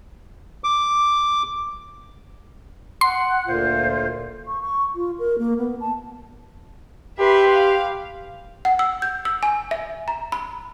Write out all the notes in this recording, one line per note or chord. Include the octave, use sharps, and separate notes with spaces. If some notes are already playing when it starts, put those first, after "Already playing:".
D6
F#5 C6
D2 A#2 F4 C5
C#6
C#6
F4
A#4
A#3
B3
A5
G4 B4 E5 C6
F5
F#5
E6
G6
E6
G#5
E5
A#5
B5